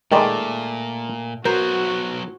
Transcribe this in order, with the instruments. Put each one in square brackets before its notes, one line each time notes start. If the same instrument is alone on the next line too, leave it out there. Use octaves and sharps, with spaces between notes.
[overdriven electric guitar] A#2 [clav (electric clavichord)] D#3 G#3 [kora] A3 D5
[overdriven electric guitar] F#3 B3 [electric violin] F#4 [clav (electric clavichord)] A#4 [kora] C5